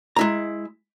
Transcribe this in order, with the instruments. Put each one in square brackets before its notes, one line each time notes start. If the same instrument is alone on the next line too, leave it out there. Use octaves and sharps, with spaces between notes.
[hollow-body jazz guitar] G#3 E4 A#5